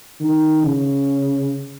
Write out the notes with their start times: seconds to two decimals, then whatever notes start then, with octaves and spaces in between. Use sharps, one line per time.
0.21 D#3
0.63 C#3